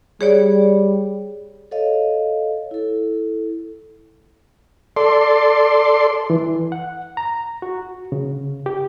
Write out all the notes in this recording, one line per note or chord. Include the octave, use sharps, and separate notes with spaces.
G3 G#4 C#5 D5
A4 C#5 D#5 F5
E4 A4
A4 D5 C6
E3
F#5
A#5
F#4
C#3
G4